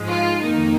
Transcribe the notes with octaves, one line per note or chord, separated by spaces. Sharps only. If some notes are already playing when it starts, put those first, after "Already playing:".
Already playing: G#2 F3 G#3
F4
F2 D#3 A#3 D#4